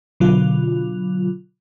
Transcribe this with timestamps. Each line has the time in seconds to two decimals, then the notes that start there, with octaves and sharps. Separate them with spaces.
0.20 B2 D3 F#3 F4